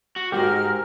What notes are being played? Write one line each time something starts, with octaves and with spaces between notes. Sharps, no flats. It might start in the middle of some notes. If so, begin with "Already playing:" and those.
F#4
C#2 G#2 F#4 G4 A#4 F6